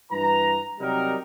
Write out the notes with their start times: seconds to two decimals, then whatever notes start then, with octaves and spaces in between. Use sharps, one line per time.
0.11 G2 E3 B4 A#5
0.80 C3 F#3 G3 D#4 A#4